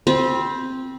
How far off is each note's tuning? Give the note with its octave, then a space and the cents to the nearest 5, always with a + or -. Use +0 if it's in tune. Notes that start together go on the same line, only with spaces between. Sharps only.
C4 +0 B5 -30